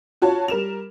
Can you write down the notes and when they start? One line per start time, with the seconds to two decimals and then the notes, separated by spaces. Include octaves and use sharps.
0.22 F4 F#4 C#5 A5
0.48 G3 A#4 E7 F7